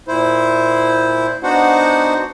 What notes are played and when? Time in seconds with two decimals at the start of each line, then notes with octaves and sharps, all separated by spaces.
0.08 A#2 E4 C5
1.43 B3 D4 D#4 F#4 C5 F#5